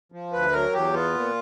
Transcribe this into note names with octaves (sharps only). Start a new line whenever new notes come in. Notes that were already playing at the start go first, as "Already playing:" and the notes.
F3
D2 B4
F#3 A#4
E2 G4
B3 F4
A#2